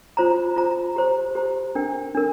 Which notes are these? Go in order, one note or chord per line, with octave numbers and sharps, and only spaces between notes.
F4 C5 A#5
F4 C5 A#5
G4 C5 A#5
G4 C5 A#5
D4 A#4 G5
D4 A#4